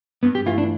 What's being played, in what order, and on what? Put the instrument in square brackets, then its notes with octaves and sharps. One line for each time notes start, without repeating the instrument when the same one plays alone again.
[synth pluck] G2 [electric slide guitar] B3
[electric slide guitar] G4
[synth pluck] E3 A3 E4 [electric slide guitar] F4
[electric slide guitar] D4